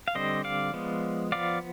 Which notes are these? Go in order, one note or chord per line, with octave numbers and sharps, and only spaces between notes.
F5
D3 G3 C4 C5 D#5
D5 F5
F3 G#3 B3
F3 B3 D5 F5